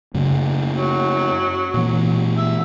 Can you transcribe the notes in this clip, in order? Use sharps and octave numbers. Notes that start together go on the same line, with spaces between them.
F#2 C#3 A3
F#3
A#2 E3
E5